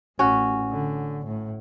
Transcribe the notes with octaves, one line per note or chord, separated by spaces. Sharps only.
A1 C#4 F#4
D3
A2